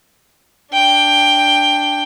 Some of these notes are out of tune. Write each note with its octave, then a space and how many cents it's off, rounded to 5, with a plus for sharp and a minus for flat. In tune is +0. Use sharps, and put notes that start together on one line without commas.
D4 +0 G5 +10